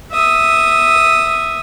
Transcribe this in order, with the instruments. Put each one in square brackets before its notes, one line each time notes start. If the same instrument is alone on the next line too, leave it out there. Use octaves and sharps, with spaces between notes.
[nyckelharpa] E5 D#6